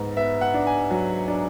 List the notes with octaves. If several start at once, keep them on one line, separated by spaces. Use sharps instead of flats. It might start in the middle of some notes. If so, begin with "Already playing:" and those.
Already playing: G#2 B3
B3 E5
F#5
D4
G#5
F#3
D4